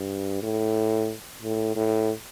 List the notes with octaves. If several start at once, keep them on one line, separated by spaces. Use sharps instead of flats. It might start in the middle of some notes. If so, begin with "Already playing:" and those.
Already playing: G2
A2
A2
A2